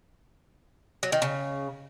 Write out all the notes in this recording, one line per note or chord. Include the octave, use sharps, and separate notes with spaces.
F#3
D#3
C#3